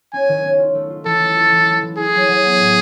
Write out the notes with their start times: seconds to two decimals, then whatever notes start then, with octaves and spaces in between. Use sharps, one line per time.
0.13 C#4 G#5
0.29 D#3
0.44 C#4
0.59 F4
0.75 A3
0.90 F4
1.05 E3 A4
1.21 A3
1.37 F4
1.52 E3
1.67 A3
1.82 E3
1.98 E4 G#4
2.13 F#3
2.29 F#3
2.44 B3
2.59 A2